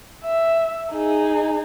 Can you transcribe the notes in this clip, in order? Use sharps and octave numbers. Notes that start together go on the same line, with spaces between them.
E5
D#4 G#4